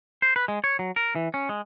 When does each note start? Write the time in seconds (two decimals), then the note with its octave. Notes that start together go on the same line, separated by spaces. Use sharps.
0.22 C5
0.36 B4
0.48 G#3
0.64 C#5
0.79 F#3
0.96 A#4
1.15 E3
1.34 C#4
1.49 G#3